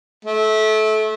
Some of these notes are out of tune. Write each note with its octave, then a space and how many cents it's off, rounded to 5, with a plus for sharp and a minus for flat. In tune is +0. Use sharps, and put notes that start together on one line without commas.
A3 -25